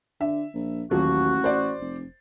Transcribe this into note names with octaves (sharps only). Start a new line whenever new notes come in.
D3 E5
A#1
D#1 A1 F#3 F#4
C5 D5
F1